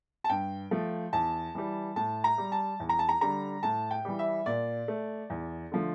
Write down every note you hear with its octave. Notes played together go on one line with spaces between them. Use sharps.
A5
G2 G5
F3 A3
E2 A5
E3 G3
A2 A5
A#5
G3
A5
E2
A#5
A5
A#5
D3 G3 A#5
A2 A5
G5
E3 G3
E5
A#2 D5
A3
E2
D3 F3 A3